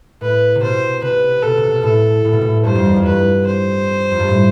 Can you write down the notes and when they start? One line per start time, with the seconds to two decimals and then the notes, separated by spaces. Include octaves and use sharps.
0.21 A2 B4
0.55 C3
0.62 B2 C5
1.02 C3 B4
1.43 B2 A4
1.58 C3
1.71 B2
1.83 A2 A4
2.24 A2
2.33 B2
2.41 A2
2.65 G2 C5
2.75 F2
2.86 E2
2.96 F2
3.05 G2 B4
3.47 C5
4.11 F2
4.20 G2
4.28 A2